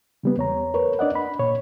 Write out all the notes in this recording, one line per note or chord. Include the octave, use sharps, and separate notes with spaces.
C#3 G3 B3
E2 C#5 A#5
A#4 B4 C#5
D4 D5 D#5 F#5
B5
A#2 C#5